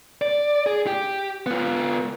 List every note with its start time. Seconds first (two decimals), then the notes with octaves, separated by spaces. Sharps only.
0.22 D5
0.67 G#4
0.87 G4
1.46 B3 F4